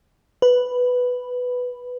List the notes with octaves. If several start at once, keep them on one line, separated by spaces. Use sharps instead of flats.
B4